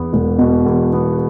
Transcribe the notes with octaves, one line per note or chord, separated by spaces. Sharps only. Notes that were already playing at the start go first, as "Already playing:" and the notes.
Already playing: E2 B3
E1
B2
E2
B3